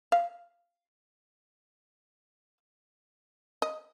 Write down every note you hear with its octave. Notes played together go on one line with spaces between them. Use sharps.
F5
D#5